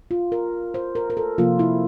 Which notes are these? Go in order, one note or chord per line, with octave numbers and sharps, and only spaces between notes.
F4
A#4
C5
A#4
A#4
A4
C3 F3 A#3 F4
E4